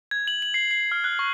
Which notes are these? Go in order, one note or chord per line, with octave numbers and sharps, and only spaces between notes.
G#6
F#7
F#7
C7
C7
F6
F#6
C#6